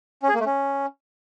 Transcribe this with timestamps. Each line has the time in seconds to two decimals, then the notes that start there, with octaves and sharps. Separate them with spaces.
0.23 C#4
0.29 G#4
0.34 A#3
0.40 A3
0.46 C#4